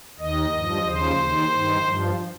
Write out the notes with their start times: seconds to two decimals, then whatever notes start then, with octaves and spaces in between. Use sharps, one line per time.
0.19 D#2 D#3 D#5
0.52 G2 F3
0.85 D#2 C#3 F3 C5
1.18 D#2 D#3
1.51 G2 D#3
1.84 G2 F3